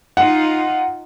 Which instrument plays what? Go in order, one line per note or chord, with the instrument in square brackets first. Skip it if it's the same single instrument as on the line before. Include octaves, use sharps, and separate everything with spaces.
[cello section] D#4 F4 [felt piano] F#5